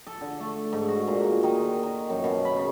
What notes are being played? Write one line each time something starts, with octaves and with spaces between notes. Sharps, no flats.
A4
D3
A3
G#2
F#4
A#2
D#3
D#3
F#2
B2
B5
C#3